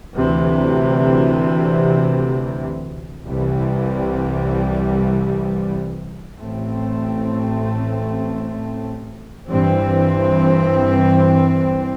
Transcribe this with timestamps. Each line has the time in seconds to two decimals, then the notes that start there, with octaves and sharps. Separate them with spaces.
0.15 D2 C3 E3
3.26 C2 C3 E3 G3
6.38 A1 A2 A3 C4
9.49 G2 E3 C4